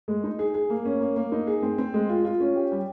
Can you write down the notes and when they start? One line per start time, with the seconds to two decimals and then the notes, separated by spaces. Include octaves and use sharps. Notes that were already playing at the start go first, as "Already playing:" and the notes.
0.08 G#3
0.24 D#4
0.39 G#4
0.54 G#4
0.70 A#3
0.85 C#4
1.01 A#3
1.16 A#3
1.32 D#4
1.47 G#4
1.62 C4
1.78 C4
1.94 G#3
2.09 F4
2.25 F4
2.40 C#4
2.56 G4
2.72 G3